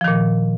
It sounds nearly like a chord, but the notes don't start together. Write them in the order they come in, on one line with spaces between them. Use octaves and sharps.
F3 D#3 A#2